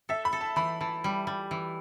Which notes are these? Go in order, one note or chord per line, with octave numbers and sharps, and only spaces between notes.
A4 E5
B5
A4
A5
E3 B5
E3 A5
G3
G3
E3